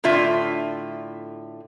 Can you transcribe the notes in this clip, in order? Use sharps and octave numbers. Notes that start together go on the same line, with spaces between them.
A2 D3 F4 E5